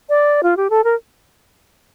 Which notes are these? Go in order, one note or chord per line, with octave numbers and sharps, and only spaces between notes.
D5
F4
G4
A4
A#4